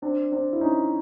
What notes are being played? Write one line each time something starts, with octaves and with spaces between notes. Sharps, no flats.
C4 D4
C4 D4
E4
C#4 D#4